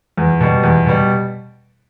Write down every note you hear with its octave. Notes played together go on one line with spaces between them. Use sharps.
E2
B2 G3
E2
B2 G3